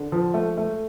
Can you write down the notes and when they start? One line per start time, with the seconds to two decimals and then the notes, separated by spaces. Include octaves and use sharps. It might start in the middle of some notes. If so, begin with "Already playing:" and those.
Already playing: D3
0.12 F3
0.34 A3
0.58 A3